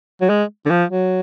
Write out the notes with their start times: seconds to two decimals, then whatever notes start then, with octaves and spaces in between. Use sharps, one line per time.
0.21 F#3
0.29 G#3
0.65 D3
0.70 F3
0.89 F#3